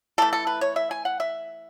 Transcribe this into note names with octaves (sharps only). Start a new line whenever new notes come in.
E3 A3 A4
A4
B4
C#5
E5
G#5
F#5
E5